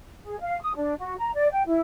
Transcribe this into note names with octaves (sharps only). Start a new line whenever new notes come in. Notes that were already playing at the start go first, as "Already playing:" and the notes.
G#4
F5
D#6
D4
F#4
A#5
D5
G5
E4